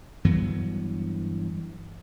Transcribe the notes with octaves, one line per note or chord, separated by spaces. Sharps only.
G2 E3 F#3 B3